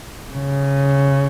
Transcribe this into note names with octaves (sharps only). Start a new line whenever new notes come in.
C#3